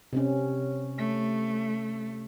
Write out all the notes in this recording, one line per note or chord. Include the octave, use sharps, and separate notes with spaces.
C3 C4 C#4
A3